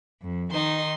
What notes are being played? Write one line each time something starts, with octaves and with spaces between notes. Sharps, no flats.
F2
D#3 D#4 C6